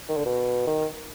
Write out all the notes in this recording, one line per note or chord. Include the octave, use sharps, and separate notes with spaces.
D#3
D3
B2
D#3